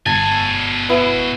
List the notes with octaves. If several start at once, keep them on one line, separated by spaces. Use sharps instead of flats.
G1 B2 G#5 A5
B3 E4